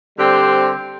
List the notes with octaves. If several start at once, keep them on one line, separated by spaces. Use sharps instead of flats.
D3 G3 C4 G4 C5